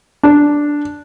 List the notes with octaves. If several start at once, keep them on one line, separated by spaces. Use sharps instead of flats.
D4